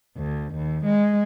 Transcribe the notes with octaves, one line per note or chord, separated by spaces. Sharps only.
D2
D#2
G#3